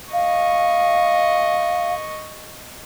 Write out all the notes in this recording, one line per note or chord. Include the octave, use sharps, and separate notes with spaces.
D#5 F5 C#6